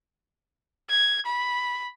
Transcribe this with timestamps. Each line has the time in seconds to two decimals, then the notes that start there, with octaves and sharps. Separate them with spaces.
0.90 G#6
1.26 B5